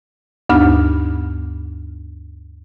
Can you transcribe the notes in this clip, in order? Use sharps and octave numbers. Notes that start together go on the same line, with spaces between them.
D2 G2 B3 D4 D#4 F6